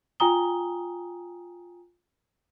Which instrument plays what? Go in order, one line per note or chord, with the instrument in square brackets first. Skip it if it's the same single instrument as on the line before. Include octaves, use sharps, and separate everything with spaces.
[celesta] F4 G5 G#5 A#5 D#6 G7